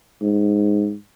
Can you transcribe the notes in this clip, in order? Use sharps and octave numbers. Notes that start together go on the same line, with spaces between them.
G#2